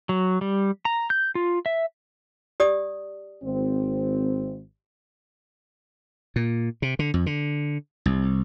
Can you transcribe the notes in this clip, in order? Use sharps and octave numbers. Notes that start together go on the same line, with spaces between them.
F#3
G3
A#5
G6
F4
E5
G4 D5 D#6
G#1 C4
A#2
C3
D3
F2
D3
C2